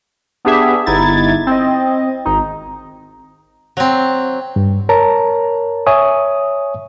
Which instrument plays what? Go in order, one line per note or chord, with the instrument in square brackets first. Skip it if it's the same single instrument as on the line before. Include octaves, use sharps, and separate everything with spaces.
[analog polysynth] B3 D4 G4 G#4 E5
G1 D#4 E4 G#6 A6
C4 D#5
G#1 D#4
[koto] F#3 C4
[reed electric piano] G2
A#4 C#5 A5 A#5
C#5 E5 G#5 C#6 D#6